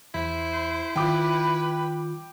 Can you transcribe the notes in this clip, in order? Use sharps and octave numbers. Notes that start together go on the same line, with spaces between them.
E2 E4 C5
D#3 F4 B4 G5 D6